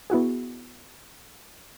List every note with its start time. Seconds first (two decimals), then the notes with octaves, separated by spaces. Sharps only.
0.10 B3 E4 F#4 G#4